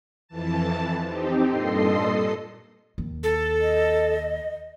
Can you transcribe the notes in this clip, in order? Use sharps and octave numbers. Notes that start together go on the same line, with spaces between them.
F2 E3 A5
C4 D#4 G4
G2 A#2 A4 D#5 C6 C7
D#2
A4
D#5